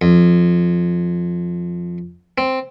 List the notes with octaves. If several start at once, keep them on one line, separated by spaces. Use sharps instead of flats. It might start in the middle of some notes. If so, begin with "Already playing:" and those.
F2
C4